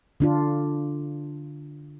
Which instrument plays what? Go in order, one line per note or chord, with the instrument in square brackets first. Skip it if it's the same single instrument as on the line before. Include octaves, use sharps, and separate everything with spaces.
[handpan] D3 D4 F4